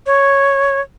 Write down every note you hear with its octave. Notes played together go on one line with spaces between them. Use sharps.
C#5